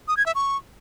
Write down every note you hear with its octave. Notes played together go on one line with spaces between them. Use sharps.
D#6
G#6
E5
C#6